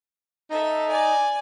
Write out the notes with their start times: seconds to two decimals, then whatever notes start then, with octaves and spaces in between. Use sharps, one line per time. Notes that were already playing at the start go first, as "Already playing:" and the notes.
0.50 D#4 A4 E5
0.89 D5 G#5